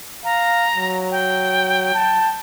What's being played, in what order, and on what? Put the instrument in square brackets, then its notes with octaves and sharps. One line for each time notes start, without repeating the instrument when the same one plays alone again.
[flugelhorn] F5 [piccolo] A#5
[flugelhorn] F#3
[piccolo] G5
[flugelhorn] A5